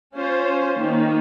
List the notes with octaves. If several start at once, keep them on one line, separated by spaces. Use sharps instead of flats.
C#4 F4 C5
D#3 A#3 D#4